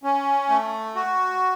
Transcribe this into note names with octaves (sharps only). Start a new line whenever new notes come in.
C#4
A3
F#4